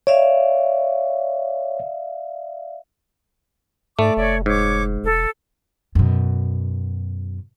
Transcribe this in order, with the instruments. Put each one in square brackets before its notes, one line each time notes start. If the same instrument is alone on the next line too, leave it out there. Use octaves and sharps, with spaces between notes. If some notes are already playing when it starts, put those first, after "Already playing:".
[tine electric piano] C#5 [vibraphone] D5 E5 F5
[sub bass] G#2 [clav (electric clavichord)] A3 [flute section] D5 D6
[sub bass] F1 [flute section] C#5 D5 E5
[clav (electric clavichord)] G#2 [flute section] C#5 D6
[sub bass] E1 [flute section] A4
[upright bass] F#2 B2